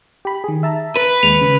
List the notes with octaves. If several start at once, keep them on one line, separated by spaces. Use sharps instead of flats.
G4 B5
D#3 G#4
E5 A5 A#5
B4
D#2 G#3 C#7 F7
C#3